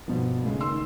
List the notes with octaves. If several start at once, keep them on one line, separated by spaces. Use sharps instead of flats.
G2 B2 F3
C#3 G#3 A3
D#3 C6 E6